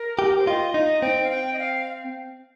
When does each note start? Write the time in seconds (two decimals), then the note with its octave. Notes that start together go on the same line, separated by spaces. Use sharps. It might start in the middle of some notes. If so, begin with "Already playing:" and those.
Already playing: A#4
0.19 G4
0.39 C5
0.47 F4 D#5
0.74 D#4 D#5
1.02 C4 G5
1.24 F5
1.31 G5
1.53 D#5
1.59 F5